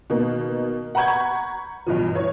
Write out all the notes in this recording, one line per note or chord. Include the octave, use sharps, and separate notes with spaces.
B2 D#3 A#3
F#5 A#5 B5 C#6 G6 G#6
B1 G2 E3 F3
E3 C#5